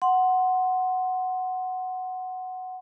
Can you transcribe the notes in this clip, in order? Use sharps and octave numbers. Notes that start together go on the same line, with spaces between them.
F#5 C6